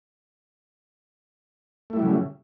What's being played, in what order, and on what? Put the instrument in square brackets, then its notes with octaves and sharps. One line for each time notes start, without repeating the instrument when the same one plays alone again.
[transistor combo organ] A3
E4
G3
F#3
C#3